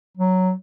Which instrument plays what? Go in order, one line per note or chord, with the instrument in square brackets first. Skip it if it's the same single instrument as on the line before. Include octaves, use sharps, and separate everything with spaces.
[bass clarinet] F#3